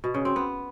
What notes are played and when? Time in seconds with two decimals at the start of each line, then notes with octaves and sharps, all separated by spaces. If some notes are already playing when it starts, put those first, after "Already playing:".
0.04 B2
0.14 C#3
0.25 C4
0.36 B3